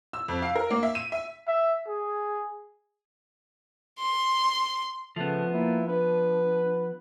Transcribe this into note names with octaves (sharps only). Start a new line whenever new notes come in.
E6
F2
F5
A#4
A#3
E5
D#7
E5
E5
G#4
C6
C#3 F3 A3 B3
A#3 E4
D4 B4